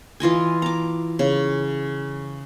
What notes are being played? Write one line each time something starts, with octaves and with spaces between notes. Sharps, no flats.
E3 F4 D#5 G#5
A#5 D6
C#3